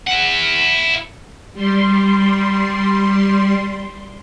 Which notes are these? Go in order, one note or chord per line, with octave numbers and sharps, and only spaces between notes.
E4 F#5
G3 C6